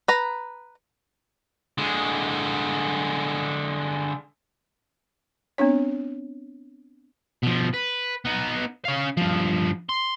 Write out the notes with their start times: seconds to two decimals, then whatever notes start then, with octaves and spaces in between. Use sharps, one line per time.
0.08 B4 A#5
1.78 D3 G#3
5.58 B3 C4 D4 C#5
7.43 B2 F3
7.73 B4
8.25 B3 D#4
8.85 C#4 F5
9.17 G2 F3
9.89 C6